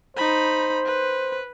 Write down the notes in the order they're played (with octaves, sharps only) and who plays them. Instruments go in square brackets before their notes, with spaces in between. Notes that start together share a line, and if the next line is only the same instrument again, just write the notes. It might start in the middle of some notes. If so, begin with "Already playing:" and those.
[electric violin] D#4 B5 [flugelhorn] C5
[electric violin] B4